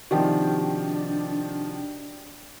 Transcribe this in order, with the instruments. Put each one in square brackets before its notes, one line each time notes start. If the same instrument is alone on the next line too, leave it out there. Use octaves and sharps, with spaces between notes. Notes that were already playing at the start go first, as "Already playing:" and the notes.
[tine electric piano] C3 F#4 [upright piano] D#3 F3 [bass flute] D4 [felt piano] G4 D5 G5